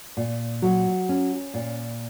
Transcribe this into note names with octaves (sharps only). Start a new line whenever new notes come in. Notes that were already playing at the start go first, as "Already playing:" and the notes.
A#2
F#3
C#4
A#2